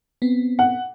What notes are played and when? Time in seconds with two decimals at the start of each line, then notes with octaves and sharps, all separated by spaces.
0.22 B3 C4
0.59 F#5